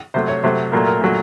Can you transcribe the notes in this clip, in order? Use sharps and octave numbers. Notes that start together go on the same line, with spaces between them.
C3 F#3 A3 C5
C#5
C3 F#3 A3 C5
A#2 F#3 A3 A#4
A#4
A#2 F#3 A3